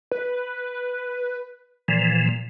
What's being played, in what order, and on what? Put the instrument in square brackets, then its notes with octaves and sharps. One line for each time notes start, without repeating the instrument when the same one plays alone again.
[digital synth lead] B4
[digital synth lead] A#2 [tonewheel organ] E3 F3